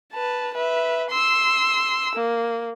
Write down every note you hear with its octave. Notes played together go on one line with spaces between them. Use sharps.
B4 A5
B4 E5
C6 E6
A#3